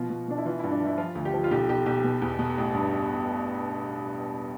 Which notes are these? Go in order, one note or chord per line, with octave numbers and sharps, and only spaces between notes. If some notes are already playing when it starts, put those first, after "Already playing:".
Already playing: B2 F3 F4
B2
B2 D4
E4
E3 F4
G2 E4
D4
E3 E4
F3 F4
D2
G4
F3
F4
B1 G4
B1 G4
B1 G4
B2
E2
B2
A1
G2